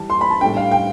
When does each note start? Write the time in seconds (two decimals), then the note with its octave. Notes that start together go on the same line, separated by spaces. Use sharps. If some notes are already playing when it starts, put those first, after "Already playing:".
Already playing: E3 G3 A5
0.10 C6
0.21 B5
0.30 A5
0.41 A2 G3 D4 G5
0.57 F5
0.72 G5